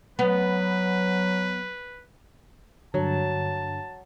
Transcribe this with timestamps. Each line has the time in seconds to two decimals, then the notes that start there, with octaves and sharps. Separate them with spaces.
0.19 F#3 B3 B4
2.94 G2 D3 F#3 A5